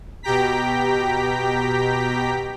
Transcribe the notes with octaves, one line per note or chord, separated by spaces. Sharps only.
B2 G4 G5 A#5 B6